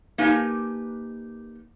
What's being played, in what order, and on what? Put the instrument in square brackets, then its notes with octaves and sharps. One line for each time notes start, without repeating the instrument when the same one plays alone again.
[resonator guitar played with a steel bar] A#3 D#4 G4 B4 G#5 A5